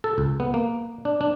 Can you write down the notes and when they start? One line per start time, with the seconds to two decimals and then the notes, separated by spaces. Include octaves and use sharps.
0.04 A4
0.18 C#2
0.40 B3
0.54 A#3
1.05 D4
1.21 D4